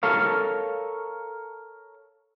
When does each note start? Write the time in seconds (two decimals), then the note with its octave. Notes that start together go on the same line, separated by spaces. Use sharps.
0.03 A4 A#4 C#5 F5